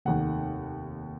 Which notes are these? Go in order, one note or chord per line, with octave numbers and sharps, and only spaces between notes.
F1 D#2 D#3 F#5